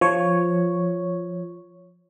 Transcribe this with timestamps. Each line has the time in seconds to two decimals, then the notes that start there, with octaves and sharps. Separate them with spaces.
0.01 F3 C#5